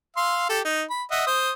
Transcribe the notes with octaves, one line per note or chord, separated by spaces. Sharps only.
F5 C6 E6
G4 A4
D#4
B5
D#5 E5 F#5
C5 D#6